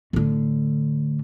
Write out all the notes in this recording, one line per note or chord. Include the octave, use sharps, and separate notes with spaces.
A2 D3